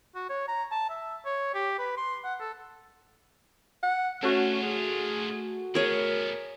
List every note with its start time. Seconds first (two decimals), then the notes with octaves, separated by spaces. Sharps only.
0.15 F#4
0.29 C#5
0.48 A#5
0.71 A5
0.90 E5
1.25 C#5
1.54 G4
1.79 B4
1.97 C6
2.24 F#5
2.40 A4
3.83 F#5
4.23 A3 C#4 D4 F4 F#4
4.63 G#4
5.75 A2 B3 G#4 A#4 C#5